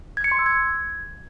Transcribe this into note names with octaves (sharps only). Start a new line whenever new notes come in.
G#6
C#7
C6
E6
G#6